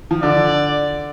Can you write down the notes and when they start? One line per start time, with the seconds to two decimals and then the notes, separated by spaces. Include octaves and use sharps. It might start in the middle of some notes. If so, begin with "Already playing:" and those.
0.11 F3
0.23 D3 D5